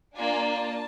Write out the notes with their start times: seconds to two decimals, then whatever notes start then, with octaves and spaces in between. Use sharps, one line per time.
0.16 A#3 D4 F4 G#5
0.54 A5